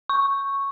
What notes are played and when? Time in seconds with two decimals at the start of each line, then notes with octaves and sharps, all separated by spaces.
0.10 C#6